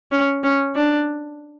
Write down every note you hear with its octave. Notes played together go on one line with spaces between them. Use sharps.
C#4
C#4
D4